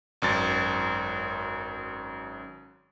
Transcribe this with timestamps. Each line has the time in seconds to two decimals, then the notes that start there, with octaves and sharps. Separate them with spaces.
0.22 G#1 F#2 A6